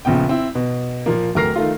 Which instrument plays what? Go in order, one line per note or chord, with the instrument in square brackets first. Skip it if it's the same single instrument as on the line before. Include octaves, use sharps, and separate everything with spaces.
[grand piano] A#1 C#3 B3 G5
C4 E4
B2
A#2 F3 A#3
D1 A3 A#4 F6 A#6 C7
D#3 A3 F4